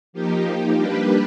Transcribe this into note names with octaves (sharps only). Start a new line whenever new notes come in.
F3 A#3 D#4 G4
G3 A#3 D4 G4 B4